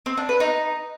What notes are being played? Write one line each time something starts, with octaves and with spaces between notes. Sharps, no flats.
C4
D4
B4
D#4